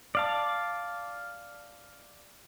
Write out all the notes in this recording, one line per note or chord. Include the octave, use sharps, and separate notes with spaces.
D5 F5 A5